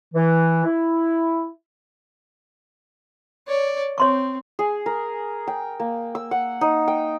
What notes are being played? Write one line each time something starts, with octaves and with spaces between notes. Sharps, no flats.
E3
E4
C#5 D5
C4 C#5 C6 C#6
G#4
A#4
G5
A#3
E6
F#5
D#4
G5